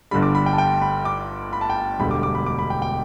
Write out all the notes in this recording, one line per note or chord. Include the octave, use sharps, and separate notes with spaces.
G1 G2 D3 G3 B5
D6
B5
G5
A5
G5
B5
D6
B5
A5
G5
A5
E1 D2 D3 G3 B5
D6
D6
B5
D6
B5
G5
G5